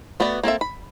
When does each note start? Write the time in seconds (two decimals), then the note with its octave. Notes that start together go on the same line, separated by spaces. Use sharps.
0.20 A3 B3 F#4 B4 D5
0.43 A#3 C4 A4 E5
0.61 B5